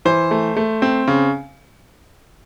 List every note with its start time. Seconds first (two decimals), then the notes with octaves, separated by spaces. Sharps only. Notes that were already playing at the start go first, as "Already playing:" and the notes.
0.05 E3 C5
0.31 A3
0.57 A3
0.82 C4
1.08 C#3